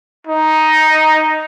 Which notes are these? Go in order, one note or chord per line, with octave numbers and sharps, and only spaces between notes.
D#4